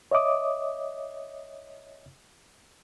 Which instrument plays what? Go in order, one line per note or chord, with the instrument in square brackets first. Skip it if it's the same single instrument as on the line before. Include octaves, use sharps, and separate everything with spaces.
[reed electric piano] C#5 D#5 E5 D6 D#6